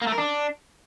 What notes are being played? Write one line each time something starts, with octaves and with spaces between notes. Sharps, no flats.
A#3
A3
A#4
D4